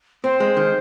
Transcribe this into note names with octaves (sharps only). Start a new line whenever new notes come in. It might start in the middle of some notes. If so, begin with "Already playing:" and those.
C4 C5
G#3
D#3